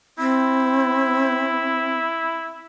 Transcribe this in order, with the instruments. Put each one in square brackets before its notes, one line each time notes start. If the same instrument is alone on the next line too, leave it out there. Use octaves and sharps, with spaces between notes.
[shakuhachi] C4 [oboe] E4